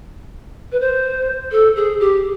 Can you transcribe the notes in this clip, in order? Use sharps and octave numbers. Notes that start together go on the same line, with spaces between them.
B4
C5
A4
G#4
G4